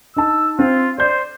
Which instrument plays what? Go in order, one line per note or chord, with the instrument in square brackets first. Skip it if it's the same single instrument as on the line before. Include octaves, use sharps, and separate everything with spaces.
[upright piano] D#4 A5 [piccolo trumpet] E6
[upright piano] C4 [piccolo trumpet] F4
[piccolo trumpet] C5 [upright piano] D5 G6